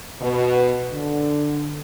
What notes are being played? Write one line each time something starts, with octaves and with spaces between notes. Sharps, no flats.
B2
D3